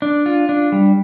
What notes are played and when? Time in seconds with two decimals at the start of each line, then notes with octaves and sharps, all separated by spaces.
0.02 D4
0.26 F4
0.49 D4
0.72 G3